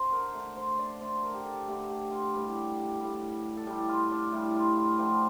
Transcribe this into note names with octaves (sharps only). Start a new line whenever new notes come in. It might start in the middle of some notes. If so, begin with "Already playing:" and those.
Already playing: D3 C5
A#4
D3 A3
C5
D5
D3 A3 C5
A#4
G4
A4
D3 A3 G4
G4
F4
A2 G3 G4
A2 G3
A4
A2 G3 G4
F4
D4
A2 G3 E4
F4
F4
D3 F3 A3 G4